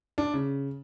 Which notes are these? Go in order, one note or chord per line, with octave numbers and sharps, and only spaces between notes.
D4
C#3